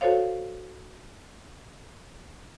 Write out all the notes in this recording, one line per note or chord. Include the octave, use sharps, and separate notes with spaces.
F#4 A4 C5 C#5 F5